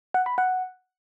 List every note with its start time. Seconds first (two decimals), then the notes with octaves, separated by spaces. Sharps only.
0.14 F#5
0.26 B5
0.38 F#5